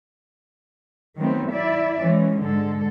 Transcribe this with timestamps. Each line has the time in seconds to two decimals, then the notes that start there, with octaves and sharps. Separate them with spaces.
1.17 D#3 F#3 A3 B3 C4
1.53 E4 D5 E5
2.01 E3 G#3 C#4
2.43 G#2 D3 G#3 A4